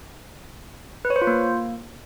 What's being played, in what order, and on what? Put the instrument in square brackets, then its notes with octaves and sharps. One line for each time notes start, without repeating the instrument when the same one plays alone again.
[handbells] B4
C#5
C5
F4
A#3